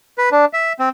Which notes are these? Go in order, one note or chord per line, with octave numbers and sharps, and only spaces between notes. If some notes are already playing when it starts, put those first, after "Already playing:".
B4
D4
E5
C4